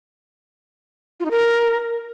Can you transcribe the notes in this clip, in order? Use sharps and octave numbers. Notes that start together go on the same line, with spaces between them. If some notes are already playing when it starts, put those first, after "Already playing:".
F4
D#4
A#4